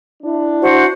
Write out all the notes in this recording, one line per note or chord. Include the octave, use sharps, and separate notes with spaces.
D4 E4
F#4 C5 F#5